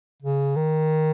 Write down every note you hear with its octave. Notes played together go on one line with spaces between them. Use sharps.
C#3
D#3